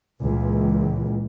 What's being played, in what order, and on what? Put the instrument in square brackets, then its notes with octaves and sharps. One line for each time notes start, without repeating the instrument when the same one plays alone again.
[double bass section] C#2 A#2 E3